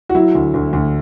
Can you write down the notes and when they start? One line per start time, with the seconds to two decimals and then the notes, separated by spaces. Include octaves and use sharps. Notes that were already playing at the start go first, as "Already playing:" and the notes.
0.09 F#4
0.15 F#3 E4
0.35 D2
0.54 D2
0.73 D2